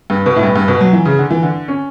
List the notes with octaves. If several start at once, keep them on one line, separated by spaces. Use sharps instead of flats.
G2
B2
A2
G2
G2
B2
F#3
E3
C#3
D3
E3
D3
C#4